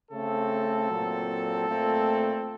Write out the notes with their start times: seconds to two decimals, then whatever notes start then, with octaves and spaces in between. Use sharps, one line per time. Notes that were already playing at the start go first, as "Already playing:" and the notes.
0.11 C#3 A3 C4 A4
0.90 A#2 F#3 C4
1.68 A#2 A3 C4